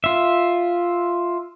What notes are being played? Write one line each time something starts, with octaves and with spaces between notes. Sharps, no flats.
F4 E5